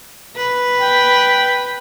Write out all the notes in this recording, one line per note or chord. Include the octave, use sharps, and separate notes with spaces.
B4
G5